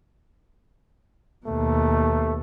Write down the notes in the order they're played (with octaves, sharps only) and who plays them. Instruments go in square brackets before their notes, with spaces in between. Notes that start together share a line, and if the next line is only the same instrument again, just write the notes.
[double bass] D#2 B2 [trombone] A3